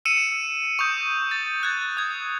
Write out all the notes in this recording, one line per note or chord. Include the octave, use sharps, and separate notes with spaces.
E6 C#7 D#7 E7
C#6 D#6 G6
A6
F#6 G#6 A6
D#6 G#6